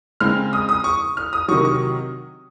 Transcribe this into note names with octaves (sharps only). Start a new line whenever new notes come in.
C#3 G#3 C4 F6
D#6
D#6
C#6
F6
D#6
C3 D#3 F#3 C#6
C#6